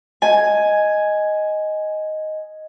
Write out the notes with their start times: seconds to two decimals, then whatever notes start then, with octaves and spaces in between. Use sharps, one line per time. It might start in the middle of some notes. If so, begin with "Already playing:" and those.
0.22 D#5 G#5